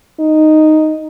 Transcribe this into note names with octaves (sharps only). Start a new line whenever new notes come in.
D#4